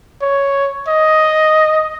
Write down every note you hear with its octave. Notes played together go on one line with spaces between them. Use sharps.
C#5
D#5